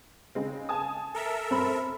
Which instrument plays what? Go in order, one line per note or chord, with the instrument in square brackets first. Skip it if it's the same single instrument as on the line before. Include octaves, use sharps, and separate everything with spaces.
[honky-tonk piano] C#3 G#3 C4
G#5 A5 D#6
[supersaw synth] A4 A#4 E5
[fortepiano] C4 B5